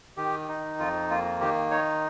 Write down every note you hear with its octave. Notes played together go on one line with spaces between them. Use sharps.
D#3 G4
D#4
F2 F4
A#3 F4
D#3 G4
D#4 C#5